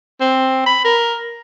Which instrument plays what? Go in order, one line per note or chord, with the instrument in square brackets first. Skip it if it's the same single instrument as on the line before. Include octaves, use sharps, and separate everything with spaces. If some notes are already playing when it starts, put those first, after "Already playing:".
[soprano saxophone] C4
B5
A#4